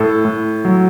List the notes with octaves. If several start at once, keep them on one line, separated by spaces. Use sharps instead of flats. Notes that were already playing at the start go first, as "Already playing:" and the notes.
Already playing: A2 A4
A2
F#3